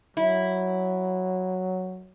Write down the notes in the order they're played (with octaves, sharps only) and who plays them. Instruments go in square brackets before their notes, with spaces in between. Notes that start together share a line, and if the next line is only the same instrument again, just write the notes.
[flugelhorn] F#3 [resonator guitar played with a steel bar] E4